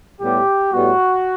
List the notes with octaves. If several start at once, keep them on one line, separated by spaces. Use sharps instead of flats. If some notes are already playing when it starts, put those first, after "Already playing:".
A2 G3 B3 G4
A2 G3 B3 F#4